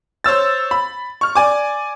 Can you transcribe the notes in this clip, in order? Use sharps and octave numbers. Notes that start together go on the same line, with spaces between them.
C5 C#5 E6 A6
B5
C#6 F6
D5 G#5 D6